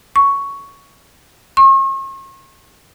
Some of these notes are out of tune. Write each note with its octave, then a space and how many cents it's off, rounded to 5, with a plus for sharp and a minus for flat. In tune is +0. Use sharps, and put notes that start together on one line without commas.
C#6 +5
C#6 -45